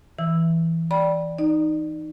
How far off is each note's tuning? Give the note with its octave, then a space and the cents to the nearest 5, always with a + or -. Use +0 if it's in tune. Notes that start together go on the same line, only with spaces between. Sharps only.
E3 +0 E6 +0
D5 +0 G5 -5 B5 -25
D#4 -5 D5 +25